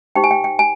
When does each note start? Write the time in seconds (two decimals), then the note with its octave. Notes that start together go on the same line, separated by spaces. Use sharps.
0.15 D#4 G4 C5 G5
0.24 G#5
0.31 G5
0.44 G5
0.59 G#5